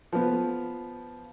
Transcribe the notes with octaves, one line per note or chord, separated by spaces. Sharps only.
F3 B3